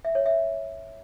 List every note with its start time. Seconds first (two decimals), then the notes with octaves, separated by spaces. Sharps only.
0.05 E5
0.15 C#5
0.26 E5